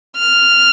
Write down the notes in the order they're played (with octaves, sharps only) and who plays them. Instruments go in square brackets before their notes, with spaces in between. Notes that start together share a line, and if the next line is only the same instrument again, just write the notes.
[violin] F6